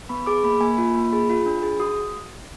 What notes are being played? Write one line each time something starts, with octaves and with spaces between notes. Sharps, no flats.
B3 B5
G#4 D6
A#3 B5
A#3 G#5
F4 B5
A#3
G#4 B5
F4
D4
G#4
F#4 D#6